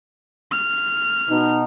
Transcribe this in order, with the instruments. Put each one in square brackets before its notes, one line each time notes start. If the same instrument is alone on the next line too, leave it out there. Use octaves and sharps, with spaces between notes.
[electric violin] F6
[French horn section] B2 D#4